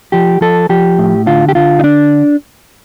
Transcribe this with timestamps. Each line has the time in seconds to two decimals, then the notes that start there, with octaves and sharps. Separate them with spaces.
0.12 F3 G4
0.41 F3 A4
0.69 F3 G4
0.99 A2
1.27 D3 F4
1.48 G4
1.55 D3 F4
1.79 D#4
1.84 D4